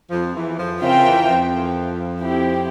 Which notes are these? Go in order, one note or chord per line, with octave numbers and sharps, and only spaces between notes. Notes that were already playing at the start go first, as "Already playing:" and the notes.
F2 F3
E2 E3
F2 F3
C#3 C4 F4 A#4 E5 G5
E2 E3
F2 F3
C4 E4 G4